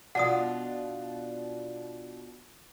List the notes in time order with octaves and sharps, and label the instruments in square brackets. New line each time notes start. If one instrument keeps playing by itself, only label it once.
[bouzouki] B2 D4 F4 [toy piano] F#5 D#6